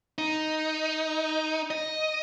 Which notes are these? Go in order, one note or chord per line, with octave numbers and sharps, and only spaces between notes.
D#4
D#5